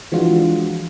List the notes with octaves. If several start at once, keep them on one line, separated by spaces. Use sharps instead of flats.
E3 F3 G#3 D4 F4 F#4